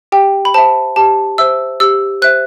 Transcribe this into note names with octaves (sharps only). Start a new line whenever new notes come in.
G4 G5
B5
C5 E5 A5
G4 A5
C5 E5 E6
G4 E6
C5 E5 F#6